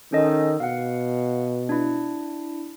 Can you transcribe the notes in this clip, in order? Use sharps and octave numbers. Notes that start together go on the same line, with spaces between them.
D#3 C#4 A4 D#5
B2 F5 F#5
D4 E4